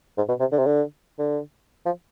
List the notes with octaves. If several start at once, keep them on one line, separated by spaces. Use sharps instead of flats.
G#2
B2
C3
D3
C3
D3
D3
F3